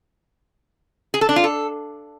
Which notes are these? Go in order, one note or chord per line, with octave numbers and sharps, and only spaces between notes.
G#4
A4
D4
F4
A4